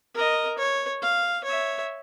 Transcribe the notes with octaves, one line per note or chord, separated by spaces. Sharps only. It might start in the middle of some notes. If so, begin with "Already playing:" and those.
A#4 D#5
C#5
F5
C#5 E5